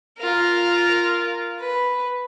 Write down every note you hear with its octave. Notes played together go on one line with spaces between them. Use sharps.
F4 A#4
B4